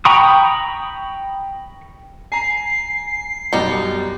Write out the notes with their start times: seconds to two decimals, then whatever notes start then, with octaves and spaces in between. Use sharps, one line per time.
0.05 G5 A#5 B5 C#6 D#6
2.32 G#5 A#5 C7
3.53 F#2 B2 G3 D#4 C#7